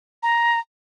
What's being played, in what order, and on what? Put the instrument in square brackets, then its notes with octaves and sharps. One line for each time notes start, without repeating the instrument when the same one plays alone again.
[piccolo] A#5